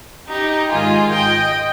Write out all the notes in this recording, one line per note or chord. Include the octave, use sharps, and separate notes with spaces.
D#4 G4
G#2 D#3 F4 G#4
D#5 G5